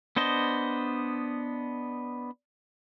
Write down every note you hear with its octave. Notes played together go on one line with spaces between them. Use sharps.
B3 D4 C5 D#5